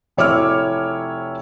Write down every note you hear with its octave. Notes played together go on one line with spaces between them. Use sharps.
F1 E4 C#5 D6 E6 F6